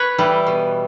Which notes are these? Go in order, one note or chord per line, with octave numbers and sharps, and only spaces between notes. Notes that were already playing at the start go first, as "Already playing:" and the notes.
Already playing: B4 C#5
E3 G3
B2